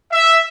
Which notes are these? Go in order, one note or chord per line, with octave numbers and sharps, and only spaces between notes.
E5